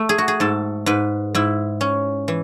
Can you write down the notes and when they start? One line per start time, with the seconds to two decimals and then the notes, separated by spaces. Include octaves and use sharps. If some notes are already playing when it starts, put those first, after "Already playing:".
Already playing: A3
0.09 G#4
0.18 F#4
0.28 G#4
0.40 G#2 A4
0.86 G#2 B4
1.35 G#2 E4
1.81 C#4
2.28 E3